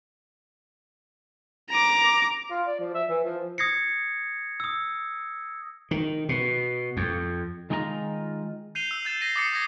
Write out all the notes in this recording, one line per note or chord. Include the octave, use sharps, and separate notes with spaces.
A#5 D6
F4
D5
F3
E5
E3
F3
D#6 G#6 A#6 C7 C#7
D#6 E6
D#3
B2
F2
D#3 G#3 D#4 F4 G5 A#5
G6 C7 D#7 F7 G7
E6
G6 A6 E7
A#6 C7 D#7
D6 D#6 A6 C7 C#7
D6 D#6 G#6 A#6